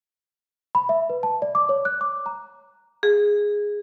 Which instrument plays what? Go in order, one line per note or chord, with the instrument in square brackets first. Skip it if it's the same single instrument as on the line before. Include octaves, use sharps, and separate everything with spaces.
[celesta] B5
E5
B4
A5
D5
D6
C#5
F#6
D6
A#5
[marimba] G#4